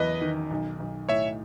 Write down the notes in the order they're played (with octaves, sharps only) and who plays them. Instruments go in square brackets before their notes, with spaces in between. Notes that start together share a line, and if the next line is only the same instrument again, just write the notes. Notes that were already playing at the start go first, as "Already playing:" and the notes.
Already playing: [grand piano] F#1 E2 F#3 [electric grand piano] B4 D#5
[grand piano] D#3
B1
B1
[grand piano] A2 [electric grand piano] C#5 E5